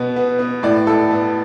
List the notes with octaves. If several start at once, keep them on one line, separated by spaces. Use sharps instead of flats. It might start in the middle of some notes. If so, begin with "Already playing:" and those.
Already playing: B2 B3
B3
B3
A2 D5
A2 A4
B3